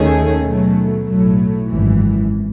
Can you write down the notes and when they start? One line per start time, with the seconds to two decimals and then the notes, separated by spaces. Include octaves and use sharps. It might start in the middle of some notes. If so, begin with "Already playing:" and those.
Already playing: D#2 D#3 A3 C#4 G#4
0.42 B2 F#3 A3
1.06 B1 A2 F#3 A3
1.67 G#1 F#2 E3